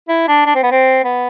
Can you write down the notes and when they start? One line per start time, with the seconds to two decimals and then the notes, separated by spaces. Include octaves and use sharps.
0.08 E4
0.28 D4
0.46 D4
0.55 C4
0.63 B3
0.71 C4
1.04 B3